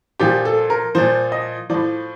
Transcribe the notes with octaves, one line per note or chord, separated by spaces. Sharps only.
A#2 F3 G4
A4
A#4
A#2 F3 C5
D#5
A2 F3 D5